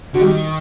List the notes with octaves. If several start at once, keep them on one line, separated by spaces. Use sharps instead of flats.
D3 F#4
D#3 G3 G4